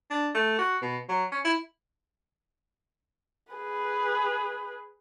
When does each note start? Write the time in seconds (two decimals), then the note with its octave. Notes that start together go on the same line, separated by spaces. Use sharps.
0.10 D4
0.34 A3
0.59 F#4
0.82 B2
1.09 F#3
1.32 C#4
1.45 E4
3.53 G#4 B4